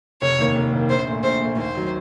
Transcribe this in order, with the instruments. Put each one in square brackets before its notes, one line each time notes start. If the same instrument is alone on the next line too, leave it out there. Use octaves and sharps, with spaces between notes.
[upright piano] F1 [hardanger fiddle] C#5
[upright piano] D#2 D#3 A#3
F1
D#2 D#3 A#3
[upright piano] A#1 [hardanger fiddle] C5
[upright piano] A#2 A3
[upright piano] A#1 [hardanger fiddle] C5
[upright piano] A#2 A3
[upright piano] D#2 [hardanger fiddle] C5
[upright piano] D#3 F#3